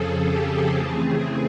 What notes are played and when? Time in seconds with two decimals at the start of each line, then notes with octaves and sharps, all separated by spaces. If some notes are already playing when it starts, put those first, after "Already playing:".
Already playing: F2 C#3 F3 G#4 A4
0.29 G4
0.78 C#3 E3 A3 C4 G#4